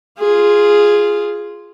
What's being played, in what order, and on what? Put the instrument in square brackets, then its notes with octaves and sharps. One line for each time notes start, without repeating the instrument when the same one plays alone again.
[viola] F4 G#4